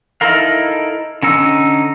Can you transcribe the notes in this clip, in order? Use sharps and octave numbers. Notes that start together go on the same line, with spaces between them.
D#4 E4 A4 A#4 F5
D3 C#4 D#4 E6